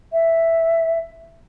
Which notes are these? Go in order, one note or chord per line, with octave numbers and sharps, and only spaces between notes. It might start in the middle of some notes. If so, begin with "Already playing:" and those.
E5